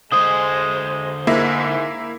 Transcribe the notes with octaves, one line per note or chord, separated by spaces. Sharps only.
D3 G#3 C5 D#6
G#2 A#3 E4